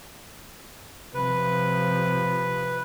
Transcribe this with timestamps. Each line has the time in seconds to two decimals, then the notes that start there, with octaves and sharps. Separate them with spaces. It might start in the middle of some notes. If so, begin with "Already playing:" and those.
1.14 C3 F3 B4